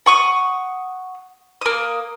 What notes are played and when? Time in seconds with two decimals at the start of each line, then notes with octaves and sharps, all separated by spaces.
0.06 F#5 C#6 D#6
1.61 A#3 D#6